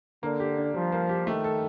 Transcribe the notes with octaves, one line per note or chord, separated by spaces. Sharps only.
D3 A#3
G4
D4
F3 G3
A#3
G4
D#3 A3
A4